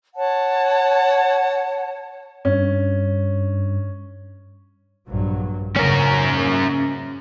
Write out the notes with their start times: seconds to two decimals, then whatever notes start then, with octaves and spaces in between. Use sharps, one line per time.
0.15 C#5 F#5 A5
2.45 G2 C#4
5.08 A#1 G2 F#3
5.76 G#2 C#3 A#3 C#4 A#4